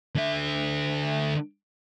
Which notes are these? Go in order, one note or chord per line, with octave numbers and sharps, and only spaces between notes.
D3 E5